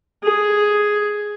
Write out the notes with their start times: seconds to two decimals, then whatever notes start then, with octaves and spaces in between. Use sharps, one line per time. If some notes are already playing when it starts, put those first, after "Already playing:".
0.24 G#4